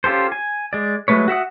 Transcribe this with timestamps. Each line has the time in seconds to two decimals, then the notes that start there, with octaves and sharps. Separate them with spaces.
0.04 C#4 F4 G4 A4 C5
0.32 G#5
0.73 G#3 D5
1.08 F#3 G#3 A3 B4 C#5
1.28 F#4 E5 F#5 D#6